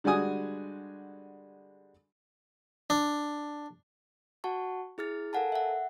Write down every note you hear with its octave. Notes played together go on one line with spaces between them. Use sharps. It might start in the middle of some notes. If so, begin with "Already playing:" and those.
D3 G3 G#3 F#4 G#5 D#6
D4
F#4 F#5 A5 C#6
E4 G#4 F6 A6
A4 A#4 F5 F#5 G#5 A5
E5 F#5